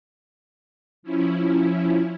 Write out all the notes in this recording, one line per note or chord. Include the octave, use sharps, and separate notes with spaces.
F3 C#4 E4